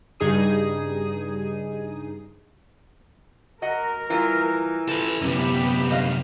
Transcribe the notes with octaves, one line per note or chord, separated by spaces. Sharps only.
G2 C#3 D#4 G#4 D#6 D#7
F#4 A#4 D#5 F#5
E3 G3 F4
F3 A4 B4
F#2 C3 B3 C#4 G4 B4
G2 D#5 F5